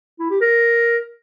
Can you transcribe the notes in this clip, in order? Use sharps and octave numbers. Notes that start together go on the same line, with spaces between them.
E4
G4
A#4